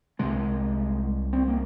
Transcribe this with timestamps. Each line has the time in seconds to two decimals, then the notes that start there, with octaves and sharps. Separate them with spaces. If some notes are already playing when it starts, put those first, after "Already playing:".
0.19 C2 C3 G#3
1.33 C4
1.48 A#3